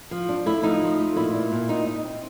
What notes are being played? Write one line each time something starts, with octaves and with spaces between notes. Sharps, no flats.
F3
D4
A3 E4
F3 D#4
F3
A3
A#2 E4
A#2
A#2
D#4
D#4
C4